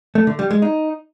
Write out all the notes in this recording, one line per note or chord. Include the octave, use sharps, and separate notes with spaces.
A3
D3
G3
G#3
D#4